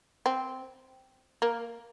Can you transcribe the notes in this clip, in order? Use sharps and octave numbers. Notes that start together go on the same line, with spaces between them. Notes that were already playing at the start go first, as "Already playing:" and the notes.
C4
A#3